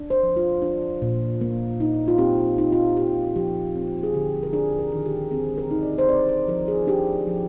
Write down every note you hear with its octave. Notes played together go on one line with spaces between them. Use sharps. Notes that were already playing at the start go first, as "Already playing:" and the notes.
Already playing: D4
C5
F3
F4
D4
A#2
A#3
D#4
F4
C4 G4
D#4 F4
F4
D#4 G4
F3 G4
C4
G#4
D3 G4
A#4
D4 G#4
A#4
D#3
G4
C4 G#4
A#4
D#4
D5
C5
C4 D5
C5
F3 A#4
G#4
D4 G4
F3